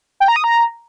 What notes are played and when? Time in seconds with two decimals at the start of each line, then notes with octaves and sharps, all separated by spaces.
0.20 G5
0.28 A#5
0.36 D#6
0.44 A#5